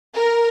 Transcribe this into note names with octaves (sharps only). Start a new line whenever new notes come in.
A#4